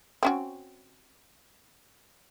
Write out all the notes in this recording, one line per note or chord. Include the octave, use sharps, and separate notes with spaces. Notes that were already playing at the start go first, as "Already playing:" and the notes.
C4 C#4 F#4